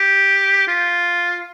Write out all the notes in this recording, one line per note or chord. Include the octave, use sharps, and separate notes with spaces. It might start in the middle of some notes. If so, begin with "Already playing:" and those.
Already playing: G4
F4